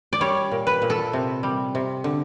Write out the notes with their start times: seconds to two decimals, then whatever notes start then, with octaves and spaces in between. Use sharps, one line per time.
0.13 D5
0.21 G3 C#5
0.52 A#2
0.67 B4
0.82 A#2
0.90 A4
1.13 C3
1.43 G3
1.75 C3
2.04 D3